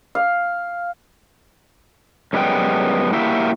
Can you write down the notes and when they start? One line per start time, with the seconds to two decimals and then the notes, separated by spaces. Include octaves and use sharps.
0.15 F5
2.33 F#2 G3 G#3 B3 G5
3.12 A#3 E4 F#4 G4 E5